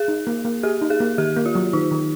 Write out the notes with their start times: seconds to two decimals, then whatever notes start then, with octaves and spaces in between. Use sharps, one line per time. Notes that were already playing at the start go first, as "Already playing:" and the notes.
Already playing: G#4
0.08 D#4
0.27 A#3
0.45 A#3
0.63 G4 G#4
0.81 D#4
0.90 G#4
1.00 A#3
1.18 D#3 G4
1.37 A#3
1.46 F4
1.55 F#3
1.73 D#3 D#4
1.91 D#3